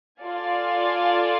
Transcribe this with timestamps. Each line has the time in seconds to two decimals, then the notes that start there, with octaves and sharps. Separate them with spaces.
0.20 F4 A4 D5 F5 G#5